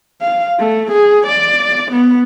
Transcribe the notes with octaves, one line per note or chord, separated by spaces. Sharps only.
F5
A3
G#4
D5
B3